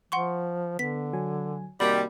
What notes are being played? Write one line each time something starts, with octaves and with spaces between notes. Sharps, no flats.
F3 F#5 C6 C#6
D3 B3 B6
F#3 G#5
C3 D#3 G3 A#3 F#4 B5